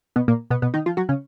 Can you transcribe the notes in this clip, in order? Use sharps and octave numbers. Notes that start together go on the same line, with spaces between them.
B2 B3
A#2 A#3
B2 B3
B2 B3
D#3 D#4
F3 F4
F#3 F#4
C#3 C#4